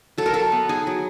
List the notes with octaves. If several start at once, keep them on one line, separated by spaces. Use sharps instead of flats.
F#3 A4
A#4
F#3 A4
B3
D#4 G#4
F#3